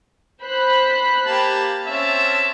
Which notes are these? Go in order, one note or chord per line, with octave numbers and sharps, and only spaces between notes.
C5 B5 F#6
A#3 G4 A5
C4 C#4 E5 A5